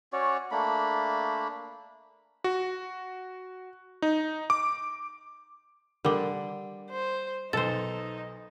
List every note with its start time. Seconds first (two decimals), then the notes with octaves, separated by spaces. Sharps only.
0.13 C#4 F#4 C#5 D5
0.51 A3 A#3 D4 B5
2.44 F#4
4.02 D#4
4.50 D6
6.05 D3 G3 A#4 D6
6.89 C5
7.53 B1 D#4 A4 C5 A6